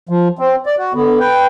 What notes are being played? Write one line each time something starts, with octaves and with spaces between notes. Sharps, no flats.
F3
C4
D5
F#4
D3 B3
B4 G5